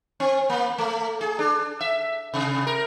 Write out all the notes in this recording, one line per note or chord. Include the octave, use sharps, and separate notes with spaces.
C4
A#3
A3
G#4
D4
E5
C3
A#4